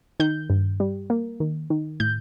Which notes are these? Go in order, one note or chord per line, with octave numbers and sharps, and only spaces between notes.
D#3 G6
G2
G3
A#3
D#3
D#3
A2 G6